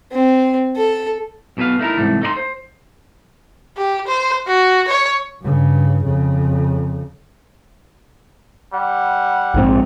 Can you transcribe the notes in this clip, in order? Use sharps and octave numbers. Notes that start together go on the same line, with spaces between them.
C4
A4
B1 B2 D4 B4 F5
A3 D#4 E4 A#4
C2 G#2 E3 A3
A3 D#4 D5 C6
C5
G4
C5
F#4
C#5
G2 C#3
F2 C#3
G3 F#5
A#1 G#2 C4